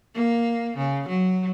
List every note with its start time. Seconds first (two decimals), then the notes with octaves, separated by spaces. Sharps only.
0.15 A#3
0.77 C#3
1.08 F#3